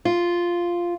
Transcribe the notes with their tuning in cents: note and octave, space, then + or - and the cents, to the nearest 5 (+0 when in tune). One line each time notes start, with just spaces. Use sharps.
F4 -5